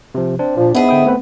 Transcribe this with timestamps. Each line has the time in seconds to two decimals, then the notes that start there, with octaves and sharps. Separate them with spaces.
0.15 C3 F3
0.39 C4 D4
0.57 A#2 F3
0.75 G#2 B3 E4 G#4
0.89 D3 G5 D#6
1.05 A3 C4 B4